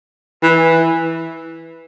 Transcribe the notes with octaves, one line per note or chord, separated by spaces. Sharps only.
E3